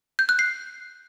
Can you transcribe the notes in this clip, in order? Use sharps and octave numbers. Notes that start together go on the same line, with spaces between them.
G6
F#6
C7